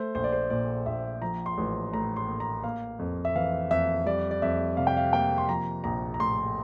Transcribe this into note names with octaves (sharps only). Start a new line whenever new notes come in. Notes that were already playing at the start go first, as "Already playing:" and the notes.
Already playing: A3 C5
A#1 C5
D5
C5
A#2 D5
A#1 E5
F3 A#5
C6
A1
A2 A#5
C6
A#3
A#5
A#3 F5
F2
E5
E3 F5
F2 E5
G3 D5
D5
F2 E5
C3 F5
G5
F5
A#3 G5
C6
F3 A#5
A#1 A#5
A#5
A2 C6